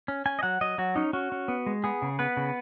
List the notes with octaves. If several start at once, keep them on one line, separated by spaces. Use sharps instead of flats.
C#4
C#4 G#5
D#5
F#3 F#5
F#3 D#5
F#3 F#4
C#4 D#4
C#4 F#4
C#4
B3
G#3
B3 G#4
C#3
B3 B4
C#3